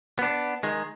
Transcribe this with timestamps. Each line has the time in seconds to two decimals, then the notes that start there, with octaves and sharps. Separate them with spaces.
0.19 B3 D4
0.63 D#3 G#3